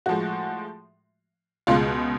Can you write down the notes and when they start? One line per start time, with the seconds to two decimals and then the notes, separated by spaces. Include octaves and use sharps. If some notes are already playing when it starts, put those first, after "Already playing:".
0.06 A2 F3 G#3 F#4
1.67 C#2 B2 G#3 F4